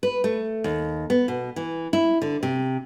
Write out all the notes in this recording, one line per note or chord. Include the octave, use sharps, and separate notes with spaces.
B4
A3
D#2
B3
B2
E3
E4
D3
C3